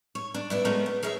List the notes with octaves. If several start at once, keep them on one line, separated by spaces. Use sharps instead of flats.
C#5
D4
B3 D4 E4
G#3 A3 B3 C#4 F#4 A#4
B3
G#4 A#4 C#5 E5